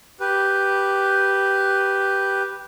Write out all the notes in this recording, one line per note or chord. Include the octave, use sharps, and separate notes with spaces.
G4 B4